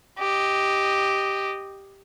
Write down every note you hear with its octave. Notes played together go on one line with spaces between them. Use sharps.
G4 D#5